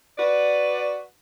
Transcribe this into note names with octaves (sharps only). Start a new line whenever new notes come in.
F#4 B4 D5